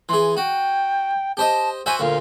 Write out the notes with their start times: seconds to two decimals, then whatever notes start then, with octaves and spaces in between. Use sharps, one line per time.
0.09 E3 G#4 C6
0.37 F#4 G5
1.37 G4 C5 D#5 A5
1.86 F#4 C5 E5 G#5
2.00 D2 A#2 F5